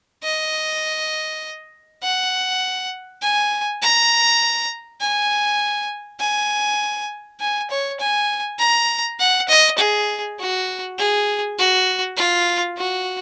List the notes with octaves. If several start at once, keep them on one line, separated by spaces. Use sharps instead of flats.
D#5
F#5
G#5
A#5
G#5
G#5
G#5
C#5
G#5
A#5
F#5
D#5
G#4
F#4
G#4
F#4
F4
F#4